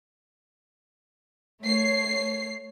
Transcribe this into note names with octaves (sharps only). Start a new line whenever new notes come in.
A3 C#5 C7